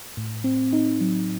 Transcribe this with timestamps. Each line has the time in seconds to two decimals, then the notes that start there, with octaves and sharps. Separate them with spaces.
0.17 A2
0.44 C4
0.73 D#4
1.01 F#3